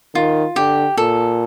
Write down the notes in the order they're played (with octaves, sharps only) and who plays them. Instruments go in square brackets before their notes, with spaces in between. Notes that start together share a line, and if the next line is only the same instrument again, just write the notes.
[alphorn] D#3 [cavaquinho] F4
[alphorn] D3 [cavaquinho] G4
[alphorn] A#2 [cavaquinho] A4